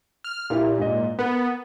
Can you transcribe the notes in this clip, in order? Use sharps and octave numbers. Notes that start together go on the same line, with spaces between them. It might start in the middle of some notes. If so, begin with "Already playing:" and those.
F6
A#2 E4 G4 A#4
G#2 D#5
B3 A#4